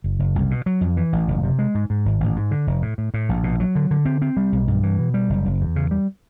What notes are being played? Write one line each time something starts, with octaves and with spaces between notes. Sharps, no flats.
F#1
F#1
C2
B2
F#3
F2
E3
A1
F#1
C3
G#3
G#2
G#2
G#1
A1
G#2
D3
F1
A2
A2
A2
A#1
B2
F#3
D3
D3
C4
C4
G3
B1
G2
E3
B2
G3
F#1
F#1
E2
C#3
G3